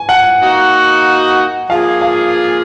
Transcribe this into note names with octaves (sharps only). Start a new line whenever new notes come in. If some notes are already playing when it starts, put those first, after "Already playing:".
Already playing: G#5
F#5
A#3 D#4 F#4
F3 A#3 F4 G#4 F5
F5